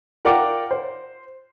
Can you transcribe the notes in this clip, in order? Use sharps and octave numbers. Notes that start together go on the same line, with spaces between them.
F4 A#4 D5 F#5 G5 D6
C5